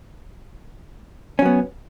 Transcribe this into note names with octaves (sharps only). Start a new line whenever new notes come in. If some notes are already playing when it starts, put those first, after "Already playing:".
F#3 B3 C#4